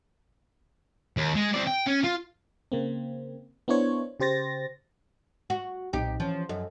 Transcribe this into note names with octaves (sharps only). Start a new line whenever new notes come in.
D#2
G#3
C4 D5
G5
C#4
F4
C#3 A#3 C4
B3 D4 E4 C5 C#5
C#3 G4 C5 A6 A#6
F#4
B1 A#2 C4 D#4 G4
E3 F3 C#4 C#5
F#2 A4 D#5